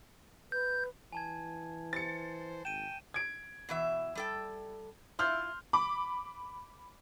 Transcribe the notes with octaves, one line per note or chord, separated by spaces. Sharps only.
B4 G6
E3 G#5 A5 G#6
C5 A6 C#7
G#1 G5 D#7 E7
G#6 D7
B2 E3 E5
G3 A4 G5
E4 F4 C6 F6 G6
B5 D6